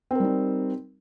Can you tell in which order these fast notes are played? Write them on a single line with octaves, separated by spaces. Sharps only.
C4 A#4 G3 D#4